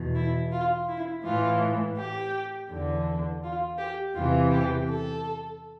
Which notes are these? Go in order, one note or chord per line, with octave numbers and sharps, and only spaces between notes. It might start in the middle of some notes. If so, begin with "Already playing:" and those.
Already playing: E2 B2
E4
F4
E4
A2 E3 F4
G4
E2 D3
F4
G4
E2 C3 E3 F4
G4
A4